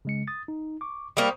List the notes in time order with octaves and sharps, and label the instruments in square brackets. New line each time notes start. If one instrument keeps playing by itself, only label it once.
[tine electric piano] C#3 G#3 C#7
D#6 A6
D#4
C#6 D6
[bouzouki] G3 A#3 [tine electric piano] C5 C#6 D#6